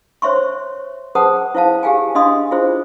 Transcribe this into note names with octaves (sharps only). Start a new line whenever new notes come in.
C5 C#5 E5 C6 C#6
G#4 B4 C5 F#5 A5 D#6
E4 C5 F5 A5
G4 G#4 F5 G5 G#5
D4 D#5 F5 C6 D#6
E4 F4 G#4 C5